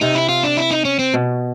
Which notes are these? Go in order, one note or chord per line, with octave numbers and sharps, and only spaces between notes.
C3 D#4
E4
F4
D4
E4
D#4
C#4
C4
B2